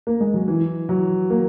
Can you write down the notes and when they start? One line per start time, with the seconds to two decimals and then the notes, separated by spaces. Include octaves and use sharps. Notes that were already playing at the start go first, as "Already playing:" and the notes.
0.07 A#3
0.21 G#3
0.34 F#3
0.48 E3
0.89 F#3
1.30 A#3